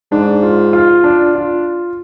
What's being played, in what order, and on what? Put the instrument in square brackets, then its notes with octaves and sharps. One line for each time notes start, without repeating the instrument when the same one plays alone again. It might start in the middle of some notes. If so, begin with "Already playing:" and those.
[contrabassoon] G#2 [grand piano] D4
[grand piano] F4
F4
D4
F4